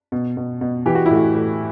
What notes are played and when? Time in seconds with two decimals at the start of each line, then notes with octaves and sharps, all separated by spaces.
0.12 B2
0.37 B2
0.61 B2
0.86 E3 G4
0.95 F#4
1.06 A2 E4
1.15 F#4
1.35 A2